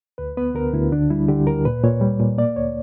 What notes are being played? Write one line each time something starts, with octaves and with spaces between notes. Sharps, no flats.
D2 B4
B3 B4
D2 A#4
D2 E4
D3 D4
G3 E4
D3 G4
D2 A#4
A#2 B4
A#2 C#5
G3
A#2
A#3 D5
D2 C#5